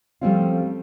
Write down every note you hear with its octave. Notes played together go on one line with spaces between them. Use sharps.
F3 G3 A3 C4 C#4 F4